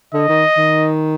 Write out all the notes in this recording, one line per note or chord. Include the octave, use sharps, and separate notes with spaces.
D3 D#5
D#3
D#3